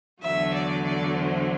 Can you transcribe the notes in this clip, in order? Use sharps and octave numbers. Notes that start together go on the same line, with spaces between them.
E2 D3 F#3 A3 E5
D5
D5
C5